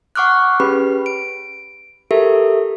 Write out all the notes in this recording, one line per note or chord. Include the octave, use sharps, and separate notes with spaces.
F#5 C#6 D6 F6 F#6
C#4 G4 G#4 B4 B5
D7
G4 A4 A#4 E5